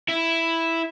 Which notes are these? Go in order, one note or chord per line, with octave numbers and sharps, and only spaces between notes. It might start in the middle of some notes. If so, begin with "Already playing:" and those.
E4